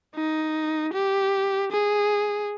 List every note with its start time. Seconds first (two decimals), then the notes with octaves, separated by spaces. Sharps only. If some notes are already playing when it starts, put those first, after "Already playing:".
0.15 D#4
0.93 G4
1.72 G#4